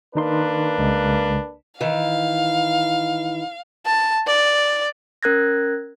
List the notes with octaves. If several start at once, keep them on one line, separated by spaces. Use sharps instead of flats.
D#3 A#3 D4 D#4 B4 C6
C2 C#3 G#3
D#3 E3 F5
A5
D5
C#4 A#4 F#6 G#6 A#6